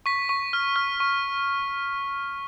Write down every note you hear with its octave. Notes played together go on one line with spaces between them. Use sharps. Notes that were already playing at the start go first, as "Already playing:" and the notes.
C#6 B6
C#6
F6
F6
C#6